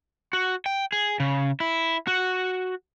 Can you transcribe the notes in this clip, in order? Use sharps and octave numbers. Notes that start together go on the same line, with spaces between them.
F#4
G5
G#4
C#3
E4
F#4